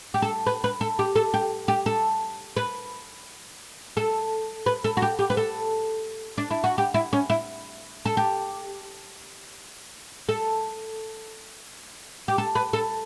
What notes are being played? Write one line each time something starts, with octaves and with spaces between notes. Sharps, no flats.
G4
A4
B4
B4
A4
G4
A4
G4
G4
A4
B4
A4
B4
A4
F#4
G4
G4
B4
A4
D4
E4
F#4
G4
E4
C#4
E4
A4
G4
A4
G4
A4
B4
A4